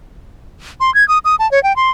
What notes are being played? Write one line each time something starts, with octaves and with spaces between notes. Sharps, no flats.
C6
G#6
D#6
D#6
A5
C#5
G5
C6